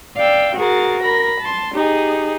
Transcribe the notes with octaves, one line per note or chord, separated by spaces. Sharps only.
D5 F5 G5 E6
F#4 G#4 A#4 A6
A#4 B5 A#6
A5 C6
D#4 G4 G#4